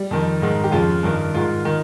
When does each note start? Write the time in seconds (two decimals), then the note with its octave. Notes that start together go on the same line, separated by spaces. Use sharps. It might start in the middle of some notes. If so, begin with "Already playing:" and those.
Already playing: G3
0.11 F2 D#3
0.42 G#2 D#3
0.64 G4
0.72 F2 C#3 F4
1.03 G2 D#3
1.34 G#2 D#3 F4
1.65 D#3